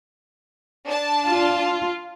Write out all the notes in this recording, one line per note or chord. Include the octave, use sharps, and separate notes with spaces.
D4 A5
F4